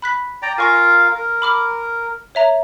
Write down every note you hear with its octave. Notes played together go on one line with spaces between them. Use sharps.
B5 F#6 B6
D5 G5 A#5
F4 A#4 F5 G#5 C#6 A#6
A#4
B5 D6 F6
C#5 E5 A#5